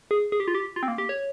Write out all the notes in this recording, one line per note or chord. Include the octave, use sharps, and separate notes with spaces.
G#4
G#4
G4
F4
G4
F4
C4
A#3
G4
C#5